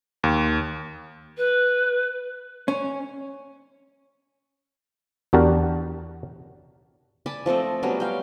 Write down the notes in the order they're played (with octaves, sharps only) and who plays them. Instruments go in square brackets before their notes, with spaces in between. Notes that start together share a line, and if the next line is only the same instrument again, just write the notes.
[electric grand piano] D#2
[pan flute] B4
[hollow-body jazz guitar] C#4
[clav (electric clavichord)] E2 D4 F#4 G4 A#4 A5
[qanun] D5 G#5 A5 B5
F3 A3 C4 D#5
F#3 G3 B3 C#4
F5 G5